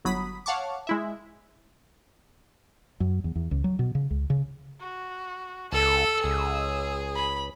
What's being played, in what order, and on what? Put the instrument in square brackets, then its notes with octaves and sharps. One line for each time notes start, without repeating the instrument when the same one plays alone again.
[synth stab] G1 F#3 B5 D#6 B6
C#5 F5 F#5 A5 C#6 D6
G#3 E4 E5
[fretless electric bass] F#2
E2
E2
C#2
F#3
B2
C#3
C#2
C#3
[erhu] F#4
[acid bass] C#2 [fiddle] A4 [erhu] E6
[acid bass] C#2 [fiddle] G#4
[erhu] B5